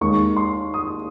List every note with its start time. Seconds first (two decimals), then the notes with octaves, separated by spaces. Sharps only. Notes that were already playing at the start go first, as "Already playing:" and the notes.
0.01 D#2 D#3 G#3 C#6
0.37 C6
0.74 D#6